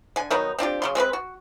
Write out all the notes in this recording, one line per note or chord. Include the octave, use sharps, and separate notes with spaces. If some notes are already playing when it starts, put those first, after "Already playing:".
D3 G#5
D#3 F#3 B3 D#4
C4 D4 F4 G4
C#3 F#3 C6
G#3 C4 F#4 B4
F#4